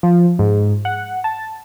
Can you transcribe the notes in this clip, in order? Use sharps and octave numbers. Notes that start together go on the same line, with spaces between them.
F3
G#2
F#5
A5